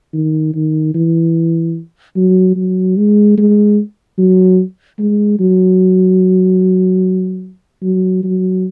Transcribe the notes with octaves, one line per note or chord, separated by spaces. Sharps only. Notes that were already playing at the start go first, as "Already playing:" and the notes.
D#3
D#3
E3
F#3
F#3
G#3
G#3
F#3
G#3
F#3
F#3
F#3